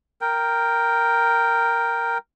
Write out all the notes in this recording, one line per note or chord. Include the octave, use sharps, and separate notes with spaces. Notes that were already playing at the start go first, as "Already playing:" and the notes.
A#4 G5